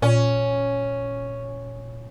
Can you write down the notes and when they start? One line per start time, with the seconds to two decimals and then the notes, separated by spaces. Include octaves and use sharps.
0.02 A#2 C#4